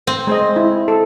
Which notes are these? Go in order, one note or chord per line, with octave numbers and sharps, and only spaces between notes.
C4
G#3 C5 D#5
E4
A4